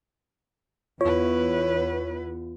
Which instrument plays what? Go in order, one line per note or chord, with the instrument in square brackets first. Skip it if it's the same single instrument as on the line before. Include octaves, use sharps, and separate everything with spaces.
[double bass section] E2 B3 [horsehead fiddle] E4 B4 [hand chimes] F4 [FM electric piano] C#5